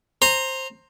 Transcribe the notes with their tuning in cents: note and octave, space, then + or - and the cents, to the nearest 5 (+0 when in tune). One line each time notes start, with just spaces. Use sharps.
C5 +10 A#5 -10